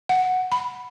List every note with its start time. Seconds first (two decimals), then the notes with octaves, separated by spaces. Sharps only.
0.09 F#5
0.52 B5